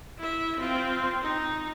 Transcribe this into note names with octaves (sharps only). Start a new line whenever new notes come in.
E4 E5
C4 F4
D#4